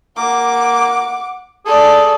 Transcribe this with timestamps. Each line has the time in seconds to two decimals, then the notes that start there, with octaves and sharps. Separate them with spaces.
0.17 A#3 F#5 D6
1.66 G#4 A4 D5